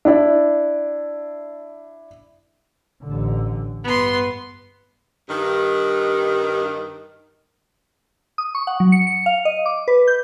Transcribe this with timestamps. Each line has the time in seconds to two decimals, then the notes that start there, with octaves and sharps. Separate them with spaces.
0.05 D4 E4 D5
3.03 A1 D3
3.84 G2 B3 C6
5.29 G2 D#3
8.38 D#6
8.55 C#6
8.67 F#5
8.80 F#3
8.92 C#7
9.07 C#7
9.26 F5
9.45 D#5
9.66 D6
9.88 B4
10.08 G6